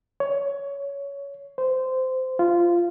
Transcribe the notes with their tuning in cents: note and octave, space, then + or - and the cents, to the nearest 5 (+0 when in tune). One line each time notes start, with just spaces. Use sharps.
C#5 +15
C5 -15
F4 -15